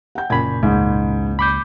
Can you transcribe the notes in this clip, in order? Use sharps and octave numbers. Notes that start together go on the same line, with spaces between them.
F#5 G5 G6
F#1 A#2 A#3 G#5 B5 G#6
C#2 G#2
B5 D6 G6